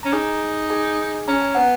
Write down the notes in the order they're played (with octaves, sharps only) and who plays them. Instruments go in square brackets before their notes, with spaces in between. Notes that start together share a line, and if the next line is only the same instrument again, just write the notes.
[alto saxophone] C#4 [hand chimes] A#5
[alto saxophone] D#4 [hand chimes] G#4 G#5
[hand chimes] G#4 G#5
[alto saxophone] C#4 [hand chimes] A#5
[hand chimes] G#5
[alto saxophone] B3 [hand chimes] F#5